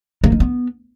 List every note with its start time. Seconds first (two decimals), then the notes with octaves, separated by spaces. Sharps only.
0.24 A#3
0.32 D#3
0.40 B3